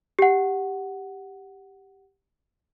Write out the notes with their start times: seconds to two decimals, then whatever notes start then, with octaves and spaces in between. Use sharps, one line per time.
0.19 G4 F#5